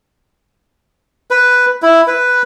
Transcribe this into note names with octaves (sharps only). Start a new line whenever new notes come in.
B4
E4
B4